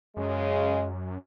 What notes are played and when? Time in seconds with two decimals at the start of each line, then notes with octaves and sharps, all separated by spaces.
0.17 F#2 C#3 G#3